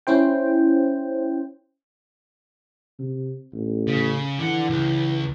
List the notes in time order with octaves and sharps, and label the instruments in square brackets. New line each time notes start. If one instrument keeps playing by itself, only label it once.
[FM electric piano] C#4 E4 C5 G5
[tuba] C3
A1
[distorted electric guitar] C#3
[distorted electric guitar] D3 F#5 [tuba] E3
[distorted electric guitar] C#2